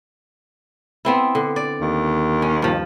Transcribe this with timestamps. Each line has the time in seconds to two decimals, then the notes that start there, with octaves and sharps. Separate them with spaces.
1.05 B3 C4 E4
1.35 D3
1.56 D5
1.81 D#2
2.42 C#4
2.62 G2 F3